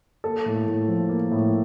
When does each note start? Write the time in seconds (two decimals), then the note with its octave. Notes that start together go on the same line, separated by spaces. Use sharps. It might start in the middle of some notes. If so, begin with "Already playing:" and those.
0.24 A#3 A4
0.46 A2
0.67 A2
0.88 F3
1.09 A#3
1.31 A2